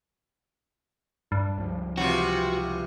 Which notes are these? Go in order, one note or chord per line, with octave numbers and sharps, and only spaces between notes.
G2 D4
C#2 F3 G3
C3 E3 F4 F#4